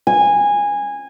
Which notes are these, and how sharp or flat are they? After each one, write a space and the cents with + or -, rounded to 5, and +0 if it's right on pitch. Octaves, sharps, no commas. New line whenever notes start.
G#5 -15